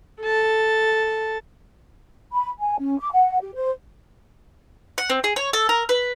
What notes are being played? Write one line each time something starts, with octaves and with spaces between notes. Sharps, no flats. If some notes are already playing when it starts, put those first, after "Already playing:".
A4 A5
B5
G#5
C#4
D6
F#5
G4
C5
F#5
C4
G#4
C#5
A4
A#4
B4